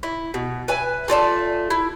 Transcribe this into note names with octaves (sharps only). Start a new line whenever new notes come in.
E4
B2
B4 E5 G#5
A3 F4 D5 A5
E4